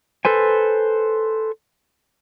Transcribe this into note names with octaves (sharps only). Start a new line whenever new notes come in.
A4 B4 C5 G#5